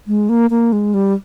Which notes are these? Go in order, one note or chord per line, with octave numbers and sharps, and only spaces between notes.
G#3
A#3
A#3
G#3
G3